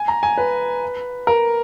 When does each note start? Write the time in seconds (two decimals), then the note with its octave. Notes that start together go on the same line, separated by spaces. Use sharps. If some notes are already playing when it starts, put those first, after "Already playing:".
Already playing: G#5
0.08 A#5
0.23 G#5
0.38 B4
1.27 A#4